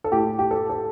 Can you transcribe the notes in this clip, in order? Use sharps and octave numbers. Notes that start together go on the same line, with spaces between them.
A4
A2 G4
G4
A4
A4